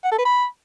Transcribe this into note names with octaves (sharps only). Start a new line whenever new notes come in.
F#5
A4
B4
B5